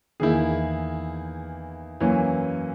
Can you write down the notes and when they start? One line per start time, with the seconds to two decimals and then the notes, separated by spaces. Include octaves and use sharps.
0.20 E2 D#3 A#3 E4 G#4
2.00 F#2 E3 A#3 C#4